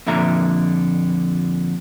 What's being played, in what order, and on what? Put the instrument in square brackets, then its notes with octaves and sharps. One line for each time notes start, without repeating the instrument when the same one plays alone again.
[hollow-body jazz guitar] F2 A#2 D3 E5 A#5